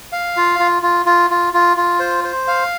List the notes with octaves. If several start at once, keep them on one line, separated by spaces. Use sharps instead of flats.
F5
F4
F4
F4
F4
F4
F4
F4
C5
C5
F5